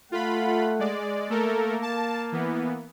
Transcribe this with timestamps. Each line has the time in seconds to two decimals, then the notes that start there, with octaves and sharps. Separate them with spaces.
0.12 A3 F4 F#5 B5
0.79 G#3 D5
1.30 A3 A#3 A4 A#4
1.82 A5
2.32 E3 B3